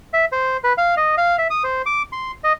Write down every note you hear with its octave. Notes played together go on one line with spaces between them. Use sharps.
E5
C5
B4
F5
D#5
F5
E5
D#6
C5
D6
C6
D#5